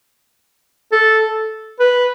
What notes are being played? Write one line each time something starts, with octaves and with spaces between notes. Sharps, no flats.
A4
B4